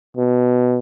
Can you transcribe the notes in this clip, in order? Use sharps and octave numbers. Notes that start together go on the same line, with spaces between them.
B2